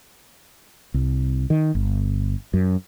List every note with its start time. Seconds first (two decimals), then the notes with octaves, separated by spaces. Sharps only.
0.94 C2
1.50 D#3
1.75 G1
2.54 F#2